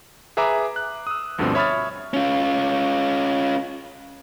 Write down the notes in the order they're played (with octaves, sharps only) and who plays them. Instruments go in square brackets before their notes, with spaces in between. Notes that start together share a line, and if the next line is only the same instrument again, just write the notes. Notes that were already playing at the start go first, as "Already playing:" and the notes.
[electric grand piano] G#4 B4 E5 A#5 D6
F#6
D#6 E6
D2 G2 B2 D3 F3 C4
C#5 E5 B5 D#6 F6 A6
[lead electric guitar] C#4 F4